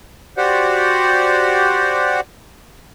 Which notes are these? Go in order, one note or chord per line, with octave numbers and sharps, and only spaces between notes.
F#4 G4 C5 D5 F#5